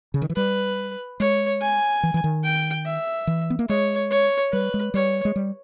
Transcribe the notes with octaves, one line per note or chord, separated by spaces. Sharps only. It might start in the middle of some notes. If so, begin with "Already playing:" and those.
C#3
D#3
E3
G3 B4
G#3 C#5
G#5
E3
E3
D#3
G5
E5
E3
B3
A#3
G#3 C#5
C#5
G3 B4
G#3
G3 C#5
G#3
G3